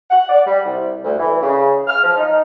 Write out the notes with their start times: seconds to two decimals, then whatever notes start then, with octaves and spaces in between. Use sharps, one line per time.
0.10 F#5
0.30 D5
0.46 G3
0.65 C2
1.04 D2
1.19 E3
1.42 C#3
1.87 F6
2.04 F3
2.17 D#4